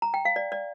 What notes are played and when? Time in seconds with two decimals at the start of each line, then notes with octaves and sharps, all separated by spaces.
0.02 A#5
0.14 G5
0.25 F5
0.36 D5
0.52 D5